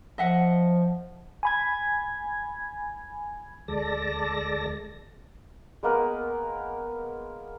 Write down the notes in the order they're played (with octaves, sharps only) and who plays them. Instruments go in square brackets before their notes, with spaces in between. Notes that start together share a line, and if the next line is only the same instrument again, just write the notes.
[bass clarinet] F3 [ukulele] D#5 E5 F#5
[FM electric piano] G#5 B5 G#6
[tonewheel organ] D2 G#3 A4 D5 A5 A#6
[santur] G#3 A#3 B3 A#4